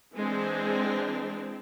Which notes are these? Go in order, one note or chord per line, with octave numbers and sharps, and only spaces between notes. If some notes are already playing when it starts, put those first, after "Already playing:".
E3 G#3 C4 D4